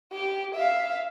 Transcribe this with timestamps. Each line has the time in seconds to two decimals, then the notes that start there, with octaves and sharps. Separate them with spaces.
0.12 G4
0.55 E5 F5